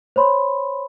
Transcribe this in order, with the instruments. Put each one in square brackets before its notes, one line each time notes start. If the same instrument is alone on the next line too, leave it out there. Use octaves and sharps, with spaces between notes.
[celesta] C5 C#5 B5 C6